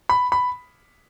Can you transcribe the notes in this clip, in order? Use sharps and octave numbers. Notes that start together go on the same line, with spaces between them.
B5
B5